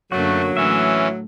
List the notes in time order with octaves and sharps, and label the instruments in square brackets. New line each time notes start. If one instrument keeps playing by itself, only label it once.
[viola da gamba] F#2 D3 A#3 [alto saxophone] F#3 [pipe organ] A3 [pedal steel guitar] F#4
[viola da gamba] A2 [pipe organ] E3 C#4 [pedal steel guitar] E5